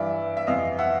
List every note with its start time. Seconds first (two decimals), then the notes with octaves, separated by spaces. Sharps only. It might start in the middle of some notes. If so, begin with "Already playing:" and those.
Already playing: G2 E3 D5 E5
0.37 E5
0.47 F2 C3 E3 D#5 F5
0.78 E5 F#5